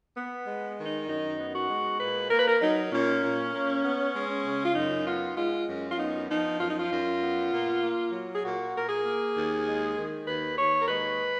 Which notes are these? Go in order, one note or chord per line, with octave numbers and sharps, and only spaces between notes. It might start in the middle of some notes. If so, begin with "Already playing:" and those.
B3
G#3
D#3
D#4
F#2 D#4
B3
F#4
G#3
A#2 B4
A#3 A#4
B4
A#4
F#3 D#4
A#2 C#4
A#2
A#3
B3
G#3
C#3
F4
F#2 D#4
B3 F4
G#3 F4
F#2
F4
B3 D#4
F3 D#4
F#2 F4
D#4
F4
F#2
B3
A#2
A#3
F#3
G#4
A#2 F#4
A#2 A#4
G#4
A#3
D#2
G#3
D#3
D#2 B4
D#2 C#5
A#4
G#3 B4